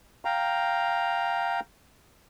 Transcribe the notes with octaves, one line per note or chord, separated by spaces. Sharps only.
F5 G5 A#5